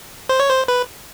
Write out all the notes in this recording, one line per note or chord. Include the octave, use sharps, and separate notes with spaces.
C5
C#5
C5
B4